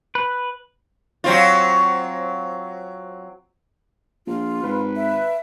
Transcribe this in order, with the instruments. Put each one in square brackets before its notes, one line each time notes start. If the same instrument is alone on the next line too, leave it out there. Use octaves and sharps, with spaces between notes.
[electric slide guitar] B4
[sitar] F#3 C4 F4
[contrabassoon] A#1 [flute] F4
[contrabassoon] G#1 [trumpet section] B4
[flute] E5